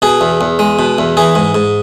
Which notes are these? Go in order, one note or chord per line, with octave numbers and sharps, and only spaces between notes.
B2 G#4
E2
E2
G#3
B2
E2
E3 G#4
G#2
G#2